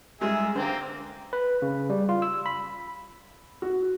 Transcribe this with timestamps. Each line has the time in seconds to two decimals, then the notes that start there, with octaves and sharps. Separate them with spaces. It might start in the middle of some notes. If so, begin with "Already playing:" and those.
0.21 G#2 G3 G#3 G#4 E5
0.55 D3 A#3 C4 C5
1.33 B4
1.62 C#3
1.90 G3
2.09 F4
2.22 E6
2.46 B5
3.62 F#4